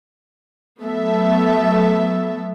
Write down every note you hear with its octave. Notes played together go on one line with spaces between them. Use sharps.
F#3 A3 B3 A4 E5